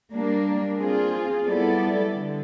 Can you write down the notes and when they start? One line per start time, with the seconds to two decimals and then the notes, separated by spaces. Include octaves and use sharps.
0.13 G3 A#3 D4
0.81 C4 F4 G#4
1.46 G3 B3 E4 A4 D5
2.14 D3